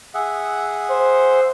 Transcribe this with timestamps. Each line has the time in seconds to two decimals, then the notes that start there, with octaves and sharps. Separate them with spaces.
0.14 G#4 E5 F#5
0.91 C5